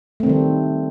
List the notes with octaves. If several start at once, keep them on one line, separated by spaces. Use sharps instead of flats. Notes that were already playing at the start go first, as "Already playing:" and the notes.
D#3 G3 A3 C4